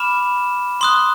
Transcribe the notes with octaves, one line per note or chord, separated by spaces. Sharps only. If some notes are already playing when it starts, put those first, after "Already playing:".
Already playing: B5 D6 F6 E7
C6 D#6 F#6 G7